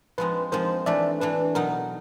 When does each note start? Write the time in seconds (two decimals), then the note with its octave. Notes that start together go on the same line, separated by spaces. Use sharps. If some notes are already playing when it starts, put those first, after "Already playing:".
0.18 F3 G#3 C4 D#4 B4
0.52 F3 G#3 C4 D#4 A#4 C5
0.86 E3 A3 D4 D5 E5
1.21 E3 A3 D4 B4
1.55 B2 F#3 B3 D#4 A#4